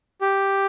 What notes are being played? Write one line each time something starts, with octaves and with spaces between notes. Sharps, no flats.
G4